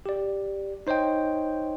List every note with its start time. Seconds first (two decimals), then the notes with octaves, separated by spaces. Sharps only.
0.06 G4 D5
0.87 D#4 C5 C#5 D#5 G5